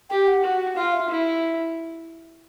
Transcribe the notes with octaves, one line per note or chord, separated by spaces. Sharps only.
G4 G5
F#5
F#4
F4 F5
E5
E4